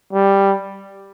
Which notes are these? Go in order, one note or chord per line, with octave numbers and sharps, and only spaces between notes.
G3